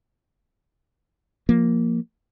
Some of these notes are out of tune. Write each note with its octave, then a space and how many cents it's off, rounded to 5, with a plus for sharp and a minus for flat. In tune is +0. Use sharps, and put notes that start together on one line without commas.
F3 +0 A#3 +0